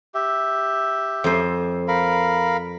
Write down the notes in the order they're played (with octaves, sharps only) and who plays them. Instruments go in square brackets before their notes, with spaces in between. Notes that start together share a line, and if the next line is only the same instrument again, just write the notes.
[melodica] G4 E5
[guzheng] F2 C5
[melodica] A#4 F5 B5